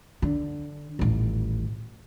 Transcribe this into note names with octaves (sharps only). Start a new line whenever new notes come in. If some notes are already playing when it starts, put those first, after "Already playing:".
D3
D#1 A1